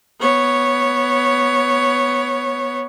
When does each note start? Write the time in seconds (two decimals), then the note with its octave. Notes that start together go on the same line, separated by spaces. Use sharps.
0.20 B3 C#5